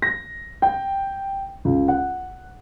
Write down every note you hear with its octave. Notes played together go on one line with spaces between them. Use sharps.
A#6
G5
C#2
F#5